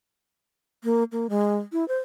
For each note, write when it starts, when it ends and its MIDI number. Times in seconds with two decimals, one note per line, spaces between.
0.84 1.03 58
1.12 1.27 58
1.30 1.56 56
1.73 1.87 64
1.88 1.97 72